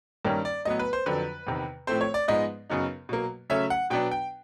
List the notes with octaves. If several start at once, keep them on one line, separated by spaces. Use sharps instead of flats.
G2 D#3 G3 A#3 C#4
D5
A2 F#3 B3 D#5
B4
C5
F2 D3 F#3 B4
E2 C3 D#3
A2 F3 A3 C4 C5
C#5
D5
G#2 F3 G#3 B3 D#4 D#5
F#2 C#3 F#3 B3 D#4
B2 F#3 A#3
C#3 F#3 A3 C#4 E5
F#5
B2 F#3 B3 D4 G5
G5